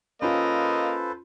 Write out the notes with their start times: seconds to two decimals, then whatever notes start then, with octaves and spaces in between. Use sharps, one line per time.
0.22 A#3 C#4 F4 A4 B4 C5 D#5